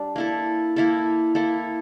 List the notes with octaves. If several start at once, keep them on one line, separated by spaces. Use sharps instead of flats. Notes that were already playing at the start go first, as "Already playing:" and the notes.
Already playing: G3 D4
A#3 E4 A4
A#3 E4 A4
A#3 E4 A4